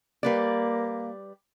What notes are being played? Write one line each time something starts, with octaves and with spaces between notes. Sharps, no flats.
G3 A#3 B4 D5